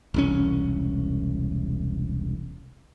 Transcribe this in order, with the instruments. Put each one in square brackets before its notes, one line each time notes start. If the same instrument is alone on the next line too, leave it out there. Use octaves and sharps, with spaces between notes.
[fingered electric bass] E1 C2 C#4